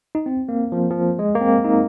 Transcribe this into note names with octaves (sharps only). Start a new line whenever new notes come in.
D#4
C4
A#3
F3
F3
G#3
A#3
C4
D#4